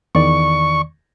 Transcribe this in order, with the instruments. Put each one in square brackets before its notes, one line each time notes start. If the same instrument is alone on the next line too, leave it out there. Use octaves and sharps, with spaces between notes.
[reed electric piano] E2 D#3 D5 [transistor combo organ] C#6